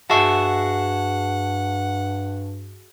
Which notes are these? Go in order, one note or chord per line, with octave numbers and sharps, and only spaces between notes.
G2 F#4 G#4 E5 F#5 A5 C#6